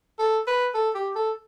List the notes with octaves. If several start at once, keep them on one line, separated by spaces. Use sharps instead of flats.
A4
B4
A4
G4
A4